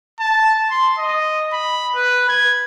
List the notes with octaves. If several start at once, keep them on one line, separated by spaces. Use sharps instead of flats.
A5
C6
D#5
B5
B4
G#6